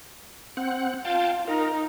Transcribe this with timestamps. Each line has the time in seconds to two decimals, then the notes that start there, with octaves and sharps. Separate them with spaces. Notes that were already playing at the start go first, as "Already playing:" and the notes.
0.57 C4 F#5
1.05 F4 F5 G5 A5
1.47 D#4 A#4